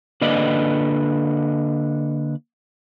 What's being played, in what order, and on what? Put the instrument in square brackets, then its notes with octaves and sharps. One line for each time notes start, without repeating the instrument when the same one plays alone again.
[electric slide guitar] D3 A#3 B4 D5 D#5